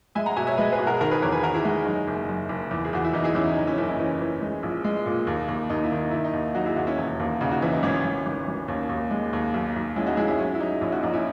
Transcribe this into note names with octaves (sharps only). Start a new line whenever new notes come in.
G#3 E5 G#5
F#5 A#5
B2 E5 G#5
C#5 E5
G#3 B4 D#5
G#4 B4
B2
F#4 A#4
G#4
D#3 F#4 A#4
G#4 B4
E2 A#4 C#5
G#4 B4
D#3 F#4 A#4
E4 G#4
G#3 D#4 F#4
F#2 D#4
F#1
F#2
F#1
E2
G#4
E2 F#4
E4
E2 D#4
E4 G#4
E2 C#4 E4
D#4
F#1 D#4
C#4 E4
F#1 C#4 E4
D#4
E3 C#4
E3
G#3
A#1
G#3
A#2
D#2
D#2
D#2 D#4
E4
D#3
D#4
D#3 E4
D#4
D#2
F#3 D#4 F#4
E4 G#4
D#2 D#4 F#4
C#4 E4
E1
D#2
C#3 D#4 F#4
D#4 F#4
E3 C#4 E4
D#4
G#1 C#4
G#1
G#1
G#1
D#2 C#4
D#2
G#3
D#2
B1
B1
G#3 C#4 E4
D#4 F#4
G#3 E4 G#4
C#4 E4
F#3 C#4
E4
F#3 D#4
A#1 C#4 E4
D#4 F#4
A#1 D#4 F#4
C#4 E4